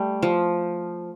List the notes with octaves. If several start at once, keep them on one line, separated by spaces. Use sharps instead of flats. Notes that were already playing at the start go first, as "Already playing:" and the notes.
Already playing: G3 A3
F3